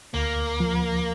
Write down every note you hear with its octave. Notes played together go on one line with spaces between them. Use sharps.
D2 A#3
F3